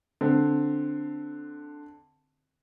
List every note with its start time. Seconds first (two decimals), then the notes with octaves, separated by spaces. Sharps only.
0.21 D3 C4